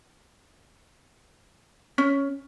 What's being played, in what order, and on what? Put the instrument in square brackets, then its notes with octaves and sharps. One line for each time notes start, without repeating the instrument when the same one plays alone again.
[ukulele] C#4